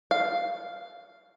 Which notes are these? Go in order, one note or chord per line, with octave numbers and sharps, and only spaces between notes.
F5